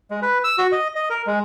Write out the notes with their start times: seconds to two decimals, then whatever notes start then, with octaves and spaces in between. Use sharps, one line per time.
0.11 G#3
0.22 B4
0.44 E6
0.58 F#4
0.72 D#5
0.95 D#5
1.10 A#4
1.27 G#3